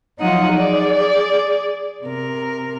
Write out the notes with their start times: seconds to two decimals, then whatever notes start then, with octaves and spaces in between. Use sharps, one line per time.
0.20 F3 F#3 D#4 F4 F#5 D#6
0.54 G#4 D5
2.03 C3 A#4